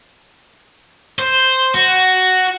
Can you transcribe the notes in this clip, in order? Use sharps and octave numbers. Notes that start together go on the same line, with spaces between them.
C5
F#4